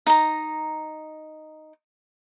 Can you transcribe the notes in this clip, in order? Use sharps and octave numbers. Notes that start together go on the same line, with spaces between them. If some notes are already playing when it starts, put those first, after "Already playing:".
D#4 A#5